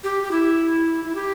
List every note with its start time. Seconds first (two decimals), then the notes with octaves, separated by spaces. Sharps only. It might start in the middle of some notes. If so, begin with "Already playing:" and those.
0.04 G4
0.23 G4
0.31 E4
1.04 E4
1.15 G4